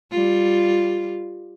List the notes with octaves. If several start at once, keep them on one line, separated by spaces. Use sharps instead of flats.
G3 F4